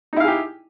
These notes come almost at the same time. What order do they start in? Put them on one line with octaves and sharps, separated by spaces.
D#4 E4 F5 G#4 G4